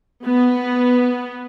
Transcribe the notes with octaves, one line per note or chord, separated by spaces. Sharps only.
B3